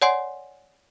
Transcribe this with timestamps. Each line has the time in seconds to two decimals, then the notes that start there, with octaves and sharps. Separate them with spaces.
0.02 C#5 D5 F#5 G#5 C6 C7